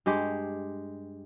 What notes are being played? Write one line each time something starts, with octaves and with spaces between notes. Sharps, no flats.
G2 G#3 G4